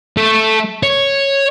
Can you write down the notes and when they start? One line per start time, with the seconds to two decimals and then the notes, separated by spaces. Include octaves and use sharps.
0.17 A3
0.83 C#5